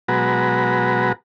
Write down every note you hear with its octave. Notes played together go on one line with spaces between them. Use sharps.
B2 F#3 G#3 F#4 B4 A#5